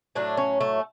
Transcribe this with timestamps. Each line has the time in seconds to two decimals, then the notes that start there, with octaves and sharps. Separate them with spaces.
0.15 A2 F#3 A3 D4
0.37 C#4
0.60 A3